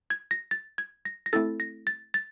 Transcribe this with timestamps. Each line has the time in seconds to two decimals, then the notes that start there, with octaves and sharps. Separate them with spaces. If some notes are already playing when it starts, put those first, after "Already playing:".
0.10 G#6
0.31 A#6
0.51 A6
0.78 G#6
1.05 A#6
1.26 A#6
1.33 A3 C4 E4 A4 A6
1.60 A#6
1.87 A6
2.14 A6